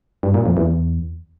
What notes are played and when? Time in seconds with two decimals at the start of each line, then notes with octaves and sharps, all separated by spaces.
0.23 G2
0.34 A#2
0.46 F2
0.57 E2